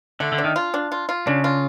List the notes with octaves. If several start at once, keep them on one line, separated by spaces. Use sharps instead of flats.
D3 A3
D3
D4
D#3
F4
D4
F4
F4
C#3 D4
F4